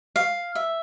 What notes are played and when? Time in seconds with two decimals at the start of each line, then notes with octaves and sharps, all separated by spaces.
0.16 F5
0.55 E5